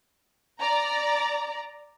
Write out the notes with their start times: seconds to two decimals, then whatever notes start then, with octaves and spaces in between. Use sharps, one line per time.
0.61 D5 A#5